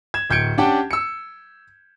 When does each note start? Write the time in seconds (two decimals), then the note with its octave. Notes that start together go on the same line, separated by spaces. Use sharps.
0.14 G#6 E7
0.30 D1 G6 G#6 C#7 D7
0.58 C#4 D4 G4 F#5 G5 A5
0.91 E6 C#7